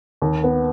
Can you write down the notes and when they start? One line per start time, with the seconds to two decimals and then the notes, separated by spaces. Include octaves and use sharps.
0.22 D#2
0.44 B3